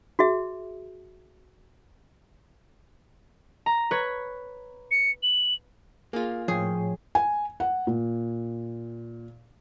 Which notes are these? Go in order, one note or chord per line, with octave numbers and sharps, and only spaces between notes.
F#4 G#4 E5
A#5
B4 C#5
C#7
F#7
A#3 F4 G#4
A2 F3 G#4 C#5 G5
G#5
F#5
A#2